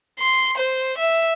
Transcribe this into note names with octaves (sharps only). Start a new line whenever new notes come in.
C6
C5
E5